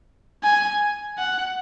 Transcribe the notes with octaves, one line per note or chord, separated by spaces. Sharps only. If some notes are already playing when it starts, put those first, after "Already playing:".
G#5
F#5